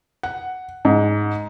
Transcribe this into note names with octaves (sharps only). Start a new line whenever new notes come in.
F#5
G#2